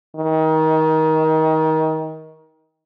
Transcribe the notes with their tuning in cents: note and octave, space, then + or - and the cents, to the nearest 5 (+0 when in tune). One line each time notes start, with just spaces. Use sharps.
D#3 +25